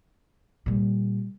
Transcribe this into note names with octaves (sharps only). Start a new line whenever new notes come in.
A#2 G3